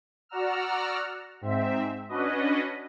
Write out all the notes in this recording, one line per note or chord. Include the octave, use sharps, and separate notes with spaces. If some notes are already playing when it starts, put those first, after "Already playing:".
F#4 D5 F#5 A#5 E6 F6
G#2 C4 E5
C#4 D4 F#4 B4 D#5